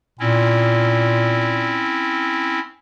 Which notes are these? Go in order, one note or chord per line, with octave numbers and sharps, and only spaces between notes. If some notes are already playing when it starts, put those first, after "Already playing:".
A#2 C4 C#4 E4